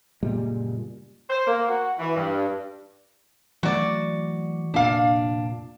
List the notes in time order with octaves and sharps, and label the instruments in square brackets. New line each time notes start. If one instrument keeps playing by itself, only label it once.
[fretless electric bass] F#1 A#2 G3 G#3
[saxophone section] C5
A#3
F#4
E3
G2
[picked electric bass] E3 F#3 A3 [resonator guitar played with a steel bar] F#4 D5
[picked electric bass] F1 A#2 [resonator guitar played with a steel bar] D4 F5